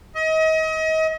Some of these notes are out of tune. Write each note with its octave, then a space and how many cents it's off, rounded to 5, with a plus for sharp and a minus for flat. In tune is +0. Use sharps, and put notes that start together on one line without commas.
D#5 +35